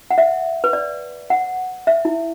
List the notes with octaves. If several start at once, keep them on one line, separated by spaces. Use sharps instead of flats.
F#5
E5
B4
D5
F#5
E5
E4